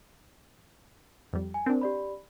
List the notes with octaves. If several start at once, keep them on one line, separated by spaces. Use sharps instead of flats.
F2 G3
G#5
C4 D4 A#4
G4 D5 B5